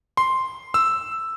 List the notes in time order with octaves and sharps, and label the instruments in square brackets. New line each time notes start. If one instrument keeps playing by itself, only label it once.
[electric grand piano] C6
E6